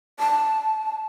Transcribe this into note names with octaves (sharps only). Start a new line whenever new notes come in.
A5